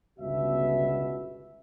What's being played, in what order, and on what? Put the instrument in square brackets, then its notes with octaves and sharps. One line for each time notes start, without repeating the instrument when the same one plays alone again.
[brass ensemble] G1 C#2 B2 F#4 E5